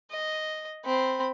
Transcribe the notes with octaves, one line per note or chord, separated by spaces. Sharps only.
D#5
C4 B5